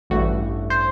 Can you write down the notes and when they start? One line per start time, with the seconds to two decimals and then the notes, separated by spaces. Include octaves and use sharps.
0.10 A1 G2 E3 A3 F#4
0.70 C5